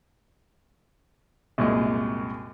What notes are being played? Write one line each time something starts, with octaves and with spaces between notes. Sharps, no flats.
C2 F#2 A#2 G#3